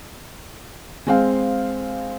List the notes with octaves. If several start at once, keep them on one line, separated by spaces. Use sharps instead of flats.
G#3 C4 F5